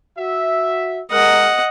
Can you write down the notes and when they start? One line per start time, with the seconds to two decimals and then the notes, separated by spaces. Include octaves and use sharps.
0.18 F#4 E5
1.11 G#3 G#4 A#4 D#5 F#5